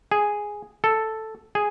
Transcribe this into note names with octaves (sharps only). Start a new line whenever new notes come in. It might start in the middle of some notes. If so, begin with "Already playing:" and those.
G#4
A4
G#4